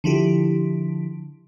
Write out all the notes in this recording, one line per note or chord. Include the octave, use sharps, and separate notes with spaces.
D3 F3 E4 G4